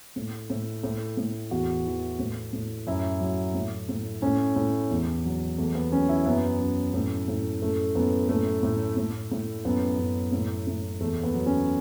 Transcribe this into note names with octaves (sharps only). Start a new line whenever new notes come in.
A2
A2
A2
A2
E2 F#4
E3
A2
A2
F#2 E4
F#3
A2
A2
A2 C#4
A2
E2
F#3
E2 A3
B3
F#3 C#4
E4
F#2 B3
F#2
A2
A2
F#2 A3
F#2 B3
A2 A3
A2
A2
A2
F#2 B3
F#2
A2
A2
E2 A3
B3
F#3
C#4